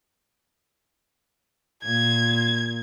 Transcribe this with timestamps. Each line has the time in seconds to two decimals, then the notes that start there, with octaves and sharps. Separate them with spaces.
1.84 A#2 G#6